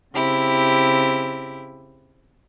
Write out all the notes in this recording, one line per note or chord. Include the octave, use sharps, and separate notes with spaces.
C#3 C4 E4 G4